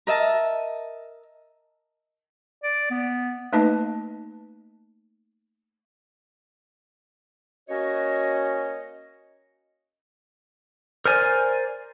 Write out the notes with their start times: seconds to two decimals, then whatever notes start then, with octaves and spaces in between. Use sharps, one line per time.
0.07 A#4 D#5 E5 A5
2.63 D5
2.91 B3
3.53 A3 A#3 D#4 B4 D#5 A5
7.69 A#3 C#4 F#4 C#5 D#5
11.05 A#4 C5 D5 G#5